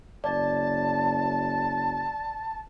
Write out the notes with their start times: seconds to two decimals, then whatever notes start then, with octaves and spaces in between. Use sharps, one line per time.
0.24 F#1 D5 A5